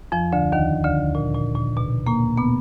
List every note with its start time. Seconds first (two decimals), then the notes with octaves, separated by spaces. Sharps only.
0.12 F2 F3
0.32 D2 D3
0.52 D#2 D#3
0.84 D2 D3
1.15 A#2
1.35 A#2
1.56 A#2
1.77 B2
2.07 A#2 A#3
2.38 B2 B3